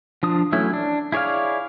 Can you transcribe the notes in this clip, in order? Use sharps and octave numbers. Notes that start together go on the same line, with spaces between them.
F3 D4 D#6
E3 F#3 A3 C#4 E4
D4
E4 G#4 C#5 D5 F5